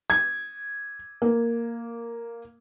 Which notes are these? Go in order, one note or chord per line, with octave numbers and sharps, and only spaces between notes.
G#6
A#3